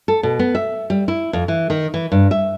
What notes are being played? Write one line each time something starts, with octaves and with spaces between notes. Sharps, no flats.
A4
B2
B3
E5
G3
E4
F2
E3
D#3
E3
G2
E5